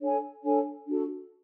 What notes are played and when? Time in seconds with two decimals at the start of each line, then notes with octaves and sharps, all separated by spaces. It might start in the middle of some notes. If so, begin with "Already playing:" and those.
0.01 D4 A4 C#5 G#5
0.44 D4 A4 C#5 G#5
0.87 D4 F#4 A4